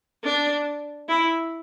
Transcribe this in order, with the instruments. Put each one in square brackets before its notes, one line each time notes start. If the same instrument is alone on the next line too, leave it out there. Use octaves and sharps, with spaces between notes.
[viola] D4
E4